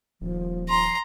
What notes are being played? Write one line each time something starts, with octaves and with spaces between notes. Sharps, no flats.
D#1 F3
A#5 C6